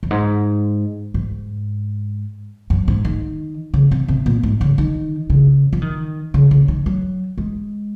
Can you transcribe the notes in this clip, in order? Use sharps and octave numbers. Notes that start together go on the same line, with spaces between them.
F#2
G#2
G#2
F#2
G#2
D#3
C#3
C3
C3
A#2
G#2
C#3
D#3
C#3
F3
D#3
C#3
C#3
D#3
F#3
G#3